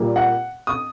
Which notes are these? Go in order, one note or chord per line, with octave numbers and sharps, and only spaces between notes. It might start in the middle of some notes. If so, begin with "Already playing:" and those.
Already playing: A#2 G3 A#3
F#5
D#6